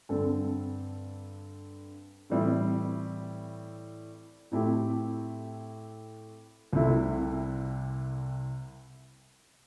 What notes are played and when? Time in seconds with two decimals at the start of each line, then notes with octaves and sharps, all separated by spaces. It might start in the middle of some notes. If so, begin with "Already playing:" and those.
0.09 G2 D3 C4 A4
2.30 A2 E3 G3 C4 E4
4.51 A2 A3 C4 E4 G4
6.73 C2 C3 A3 C4 E4